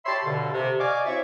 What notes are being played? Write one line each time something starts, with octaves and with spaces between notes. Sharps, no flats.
G4 C#5 E5 A5 B5 C6
G2 B2 D3
C3
D5 D#5 F5 G#5 C#6 D6
C4 E4 F#4 C#5 E5